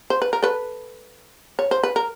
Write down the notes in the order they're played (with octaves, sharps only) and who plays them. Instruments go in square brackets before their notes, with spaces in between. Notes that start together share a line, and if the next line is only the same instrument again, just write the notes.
[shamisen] C5
B4
A#4
A4 B4
C#5
C5
B4
A#4